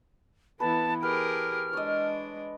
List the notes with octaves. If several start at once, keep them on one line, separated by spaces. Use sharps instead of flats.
E3 B3 E4 A4 B4 A5
G4 G#4 A#4 B4 F6
G#3 D4 C#5 D#5